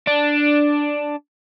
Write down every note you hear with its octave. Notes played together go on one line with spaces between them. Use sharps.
D4